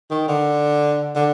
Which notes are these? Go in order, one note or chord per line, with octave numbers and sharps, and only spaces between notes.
D#3
D3
D3